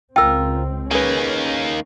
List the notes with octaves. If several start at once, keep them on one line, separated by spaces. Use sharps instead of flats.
C#2 C4 F4 A#4 G5 E6
D#3 A#3 C#4 G#4 B4